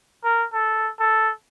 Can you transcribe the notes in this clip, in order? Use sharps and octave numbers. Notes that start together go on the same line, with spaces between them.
A#4
A4
A4